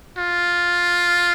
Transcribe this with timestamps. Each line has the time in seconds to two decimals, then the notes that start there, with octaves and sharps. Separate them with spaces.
0.18 F4